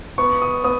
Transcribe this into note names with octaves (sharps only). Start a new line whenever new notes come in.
B3 C#6
D#6
B3 D#6